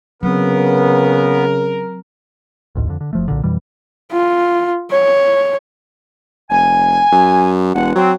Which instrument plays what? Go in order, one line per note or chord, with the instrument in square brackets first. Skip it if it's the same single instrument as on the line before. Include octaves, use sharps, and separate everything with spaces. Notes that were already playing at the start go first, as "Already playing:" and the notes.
[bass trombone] C#3 [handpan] F#3 C4 [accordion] B3 [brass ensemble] A#4
[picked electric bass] A1 D2 G#2
F2 D3
D3
F#1 F3 A3
B1 A#2 D3
F2 B2 E3 G3
[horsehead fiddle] F4
C#5
[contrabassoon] F1 [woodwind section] G#5
[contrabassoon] F#2
[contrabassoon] E1 [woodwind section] G2 G#3 F#5
[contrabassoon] F#3 [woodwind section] C4